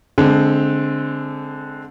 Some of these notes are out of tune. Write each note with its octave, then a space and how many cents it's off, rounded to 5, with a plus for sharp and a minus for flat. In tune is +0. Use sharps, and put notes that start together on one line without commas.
D3 -10 G#3 +15 C4 +0